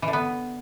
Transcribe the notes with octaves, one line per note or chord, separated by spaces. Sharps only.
E3
D3
B3